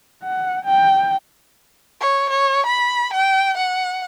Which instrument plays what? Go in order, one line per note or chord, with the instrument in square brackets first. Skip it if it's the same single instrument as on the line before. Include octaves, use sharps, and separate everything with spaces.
[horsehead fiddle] F#5
G5
[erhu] C#5
C#5
B5
G5
F#5